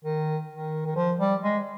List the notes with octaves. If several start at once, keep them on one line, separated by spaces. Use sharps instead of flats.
D#3
D#3
D#3
F3
G3
G#3